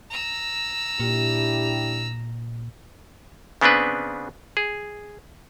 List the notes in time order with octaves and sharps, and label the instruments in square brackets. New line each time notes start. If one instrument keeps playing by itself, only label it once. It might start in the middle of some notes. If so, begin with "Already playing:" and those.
[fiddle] A#5 E6
[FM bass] A#2 [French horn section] D4 E4 G4
[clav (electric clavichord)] C#3 B3 C4 D4 B4
G#4